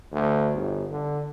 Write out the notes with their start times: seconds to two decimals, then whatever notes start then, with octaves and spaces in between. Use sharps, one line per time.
0.12 D2
0.55 G1
0.91 D3